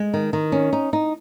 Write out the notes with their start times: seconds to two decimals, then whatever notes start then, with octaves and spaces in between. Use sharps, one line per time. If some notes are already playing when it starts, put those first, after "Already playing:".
Already playing: G#3
0.14 D#3
0.33 D#3
0.52 C#4
0.73 D#4
0.93 D#4